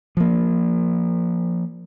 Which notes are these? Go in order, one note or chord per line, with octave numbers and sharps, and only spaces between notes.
F3 A#3